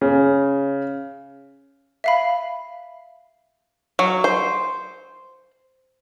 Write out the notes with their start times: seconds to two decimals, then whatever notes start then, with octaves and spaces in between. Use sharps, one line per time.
0.01 C#3
2.04 E5 F5 B5
3.99 F#3
4.24 C5